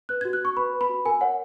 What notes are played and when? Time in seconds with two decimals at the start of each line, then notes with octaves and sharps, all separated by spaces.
0.09 B4 F#6
0.21 F#4 G#6
0.33 F#6
0.41 F#4 C#6
0.57 B4 B5
0.73 B4
0.81 B5
0.89 F#4
1.05 A#4 G#5
1.21 C#5 F#5